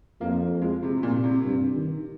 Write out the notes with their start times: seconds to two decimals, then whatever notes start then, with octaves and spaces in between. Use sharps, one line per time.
0.20 F2 A#3
0.62 G#3
0.83 C3
0.97 C3
1.03 A#2
1.24 C3
1.44 G2
1.75 D#3